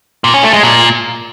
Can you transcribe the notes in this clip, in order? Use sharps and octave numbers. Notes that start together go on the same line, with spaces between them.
A#2
C#4
A3
G#3
A#2